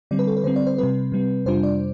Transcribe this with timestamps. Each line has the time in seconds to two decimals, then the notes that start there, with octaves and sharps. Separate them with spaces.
0.11 D3 G3 C4 D5
0.19 B4
0.27 A4
0.37 B4
0.44 D3 G3 C4 C5
0.56 D5
0.67 C5
0.78 C3 G3 C4 B4
1.12 C3 G3 C4
1.45 F2 C3 G3 D4 F4 C5
1.63 D5